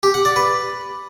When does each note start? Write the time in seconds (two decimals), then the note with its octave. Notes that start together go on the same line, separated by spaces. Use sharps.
0.03 G4
0.14 F#5
0.25 D5
0.36 B4